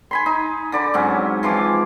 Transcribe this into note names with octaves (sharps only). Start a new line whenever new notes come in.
G#5 B5 C6
D#4
D3 D5 B5
G#2 F#3 C4 C#4
E3 F3 C6 D6